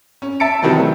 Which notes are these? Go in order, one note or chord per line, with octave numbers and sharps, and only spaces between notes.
C#4
E5 A5 A6 C#7 D7
C3 D#3 E3 F#3 G3 C4
A3